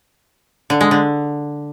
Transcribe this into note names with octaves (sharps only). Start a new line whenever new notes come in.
D3
G#3
D3